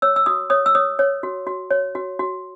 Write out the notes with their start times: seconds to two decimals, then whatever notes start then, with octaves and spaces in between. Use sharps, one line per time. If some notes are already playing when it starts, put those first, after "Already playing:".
0.02 C#5 E6
0.16 E6
0.26 F#4 D#6
0.50 C#5 D#6
0.66 E6
0.75 C#5 D#6
0.99 C#5
1.23 F#4
1.47 F#4
1.71 C#5
1.95 F#4
2.19 F#4